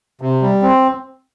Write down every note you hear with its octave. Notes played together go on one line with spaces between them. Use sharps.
C3
G3
C4